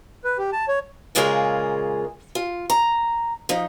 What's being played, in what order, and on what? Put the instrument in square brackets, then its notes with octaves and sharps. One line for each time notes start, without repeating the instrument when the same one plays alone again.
[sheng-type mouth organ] B4
G4
A5
C#5
[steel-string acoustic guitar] A#2 C#3 G#3 F4 G#4 A#4
F4
A#5
F3 D#4